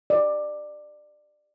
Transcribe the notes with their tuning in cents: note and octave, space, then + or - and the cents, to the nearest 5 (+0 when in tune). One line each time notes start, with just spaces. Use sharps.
D5 +25